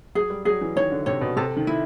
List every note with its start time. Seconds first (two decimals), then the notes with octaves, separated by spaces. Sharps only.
0.15 F#3 G#4
0.30 G3
0.45 F#3 G#4
0.61 E3
0.76 D#3 C#5
0.91 D3
1.06 C3 C#5
1.21 B2
1.37 C3 A4
1.57 D#3
1.67 E4